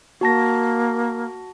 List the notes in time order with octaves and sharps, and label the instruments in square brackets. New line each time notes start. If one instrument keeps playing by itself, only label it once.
[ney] A#3 [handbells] F#4 A5 A#6